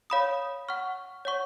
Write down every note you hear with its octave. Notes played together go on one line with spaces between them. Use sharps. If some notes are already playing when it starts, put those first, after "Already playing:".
C#5 F5 B5 D#6
F#5 C#6 F6
C#5 F#5 C#6